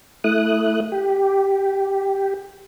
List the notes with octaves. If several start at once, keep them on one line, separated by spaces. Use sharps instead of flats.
A3 E4 D#6 F#6
G4